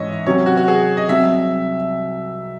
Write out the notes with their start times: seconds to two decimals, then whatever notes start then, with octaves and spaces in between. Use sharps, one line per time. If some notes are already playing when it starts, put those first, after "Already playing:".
Already playing: G#2 E3 C#4 C#5 D#5 E5
0.26 C3 F#3 C#4 C#5
0.46 F#4
0.57 F#4
0.68 G#4
0.97 D#5
1.09 C2 C3 F#3 E5